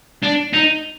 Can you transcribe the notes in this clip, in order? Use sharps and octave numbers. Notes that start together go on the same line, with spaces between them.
D4
D#4